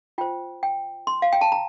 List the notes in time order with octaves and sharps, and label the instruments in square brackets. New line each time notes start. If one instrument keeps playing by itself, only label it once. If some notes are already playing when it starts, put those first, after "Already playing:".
[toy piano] F4 C5 G5
G5
C6
F5
G5
A5
A#5